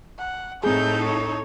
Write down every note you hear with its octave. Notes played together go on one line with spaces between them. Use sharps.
F#5
A2 C4 D#4 G#4 A4 G6
C#5